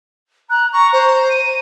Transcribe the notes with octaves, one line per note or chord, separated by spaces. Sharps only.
A#5 F#6
A#5 C#6
C5
D#7